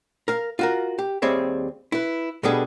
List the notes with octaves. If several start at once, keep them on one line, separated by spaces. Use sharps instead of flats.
A#4 F5
F4 F#4 A#4
G4
D#2 G3 C4 G#4 C#5 E5
E4 B4
B2 G3 B3 D4 G#4 A4